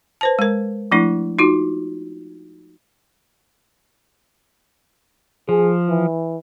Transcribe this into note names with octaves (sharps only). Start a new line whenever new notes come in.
B4 C5 A5
G#3 A#4
F3 A3 D4 E4
D#4 F4 F#4
F3 G#4
E3